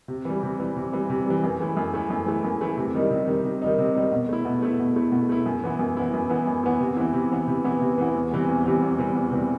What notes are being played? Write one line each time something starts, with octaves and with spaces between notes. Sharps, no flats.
C3
E3 G3
C3
E3 G3
C3
E3 G3
C3
E3 G3
F#2
E3 A3 E4
F#2
E3 A3 E4
F#2
E3 A3 E4
F#2
E3 A3 E4
C3
D#3 G3 D#4
C3
D#3 G3 D#4
C3
D#3 G3 D#4
C3
D#3 G3 D#4
B2
A3 E4
B2
A3 E4
B2
A3 E4
B2
A3 E4
F#2
E3 B3 E4
F#2
E3 B3 E4
F#2
E3 B3 E4
F#2
E3 B3 E4
C3
E3 B3 E4
C3
E3 B3 E4
C3
E3 B3 E4
C3
E3 B3 E4
E2
C3 E3 G3
E2
C3 E3 G3
E2
C3 E3 G3
E2
C3 E3 G3